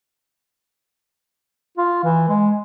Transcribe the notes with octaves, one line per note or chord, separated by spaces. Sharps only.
F4
E3
G#3